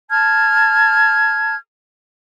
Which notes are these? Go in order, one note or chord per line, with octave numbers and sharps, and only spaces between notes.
A5 F6 G#6